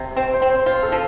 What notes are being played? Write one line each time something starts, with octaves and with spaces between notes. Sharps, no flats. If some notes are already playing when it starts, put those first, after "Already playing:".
Already playing: C3
C4 C5
C5
C4
C5
F4 C5
A4
F3